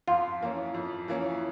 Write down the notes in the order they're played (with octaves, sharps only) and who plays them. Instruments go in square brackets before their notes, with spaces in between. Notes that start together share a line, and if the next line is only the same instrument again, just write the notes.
[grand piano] F2 [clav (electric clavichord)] F4
[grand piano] E3 A#3 C#4
F2
E3 A#3 C#4